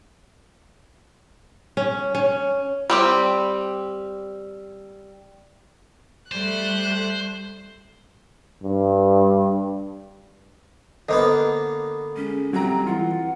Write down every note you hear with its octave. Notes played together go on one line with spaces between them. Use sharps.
C#4
C#4
G3 C4 G4
G3 A3 C5 F#6
G2
D3 A#3 B3 C5 D#5
G#3 C#4
F#3 G3 C4 A#5
E3 F4 F#5